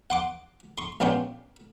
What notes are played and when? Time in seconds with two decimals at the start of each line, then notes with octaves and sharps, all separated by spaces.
0.10 F#5 C6 D6
0.78 C6 C#6
1.00 A#1 B3 C#4 D4 G5 C6